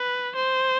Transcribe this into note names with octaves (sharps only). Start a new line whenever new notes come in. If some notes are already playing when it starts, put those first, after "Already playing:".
Already playing: B4
C5